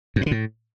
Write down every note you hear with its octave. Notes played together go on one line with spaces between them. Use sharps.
F#2
A2
D3
A2